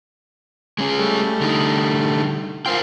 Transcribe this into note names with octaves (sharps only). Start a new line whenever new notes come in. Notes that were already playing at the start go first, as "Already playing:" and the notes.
G#3 C#4 G#4
G3 A3
D3 D#4
F4 A#4 C5 G5 C6